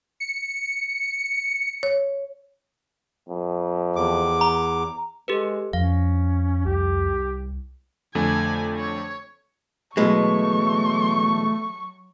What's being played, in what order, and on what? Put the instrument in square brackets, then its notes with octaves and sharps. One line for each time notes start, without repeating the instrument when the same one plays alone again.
[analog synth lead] C#7
[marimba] C#5
[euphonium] F2
[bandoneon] E2 D6
[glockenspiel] A#5
[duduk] G#3 [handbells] G4 A4 B4
[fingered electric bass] F2 [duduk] C#4 [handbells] F5
[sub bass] C2 [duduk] G4
[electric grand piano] F2 D3 A3 [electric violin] G#5
[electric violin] C#5
[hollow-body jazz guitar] B2 E3 G#3 [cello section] F#3 [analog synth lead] A3 [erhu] C#6